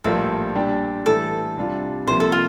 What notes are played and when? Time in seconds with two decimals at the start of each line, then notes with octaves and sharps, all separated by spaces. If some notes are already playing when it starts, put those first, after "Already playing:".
0.04 A#1 A2 G3 A#3 F4 A4
0.55 A#2 G3 D4 G4
1.06 A2 E3 G3 A4
1.57 C2 C3 G3 D4 F4
2.07 C2 C3 F3 A#3 C5
2.20 A4
2.32 F4